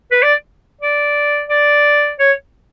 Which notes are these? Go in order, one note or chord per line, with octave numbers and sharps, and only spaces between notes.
B4
D5
D5
D5
C#5